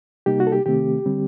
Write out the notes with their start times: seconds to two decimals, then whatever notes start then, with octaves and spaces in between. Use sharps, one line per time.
0.26 C3 G3 A#3 D#4 G4
0.40 F#4
0.47 A4
0.52 G4
0.66 C3 D#3 A3 C4 G4
1.06 D3 G3 C4